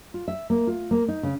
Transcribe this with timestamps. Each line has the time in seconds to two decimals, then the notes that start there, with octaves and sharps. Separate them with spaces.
0.14 F4
0.28 E5
0.50 A#3
0.67 F4
0.91 A#3
1.08 D#4
1.23 C#3